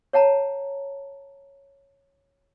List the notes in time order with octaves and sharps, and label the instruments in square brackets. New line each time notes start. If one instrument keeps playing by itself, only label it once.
[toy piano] C#5 F#5 A5 A#5